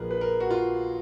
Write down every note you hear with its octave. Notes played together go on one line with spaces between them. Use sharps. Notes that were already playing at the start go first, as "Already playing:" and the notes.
Already playing: A#1 A#2 F3 G#4 A#4 B4
B4
A#4
F#4
F4